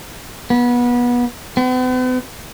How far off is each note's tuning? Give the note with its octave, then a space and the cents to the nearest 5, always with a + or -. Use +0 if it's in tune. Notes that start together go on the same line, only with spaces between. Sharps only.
B3 -25
B3 +45